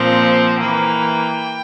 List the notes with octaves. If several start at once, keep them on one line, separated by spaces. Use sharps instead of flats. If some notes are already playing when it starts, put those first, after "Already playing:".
Already playing: A#2 F3 C4 F5
E3 A#3 G5